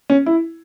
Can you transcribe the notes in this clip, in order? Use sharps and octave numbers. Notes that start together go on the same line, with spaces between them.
C#4
E4